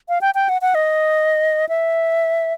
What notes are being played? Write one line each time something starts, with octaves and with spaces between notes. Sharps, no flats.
F5
G5
G5
F#5
F#5
D#5
E5